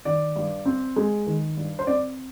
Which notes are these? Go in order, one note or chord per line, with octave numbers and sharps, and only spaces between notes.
D#3 D5
G2
C4
G#3
D#3
G2
C5
C4 D5